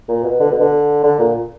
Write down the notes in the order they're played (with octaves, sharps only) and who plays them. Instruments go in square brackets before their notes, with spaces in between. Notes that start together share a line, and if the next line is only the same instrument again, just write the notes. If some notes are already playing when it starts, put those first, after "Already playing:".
[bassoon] A#2
B2
D3
B2
D3
D3
A#2